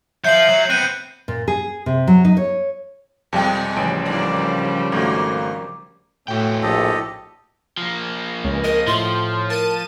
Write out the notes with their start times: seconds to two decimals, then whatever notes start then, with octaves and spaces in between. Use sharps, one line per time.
0.25 F3 F#3 E5 G6 C7 F#7
0.49 F#3
0.70 B3 C4 F#6 D#7
1.28 A#2
1.48 G#4
1.86 C3
2.07 F#3
2.25 D#4
2.37 C#5
3.33 F2 B2 G3 G#3 G5
3.76 A1 C#3 F3 G3 D7
4.06 G#2 A#3 D4
4.92 G#1 A3 A#3 F#4
6.28 A2 E4 F#4 G5
6.63 A#1 G4 A4 D#5
7.77 F3 A#3
8.44 C#2
8.64 A#4 D#5
8.87 A2 F3 C6
9.50 A#4 A5 D#7